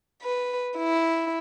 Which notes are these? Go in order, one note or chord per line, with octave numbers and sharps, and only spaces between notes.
B4
E4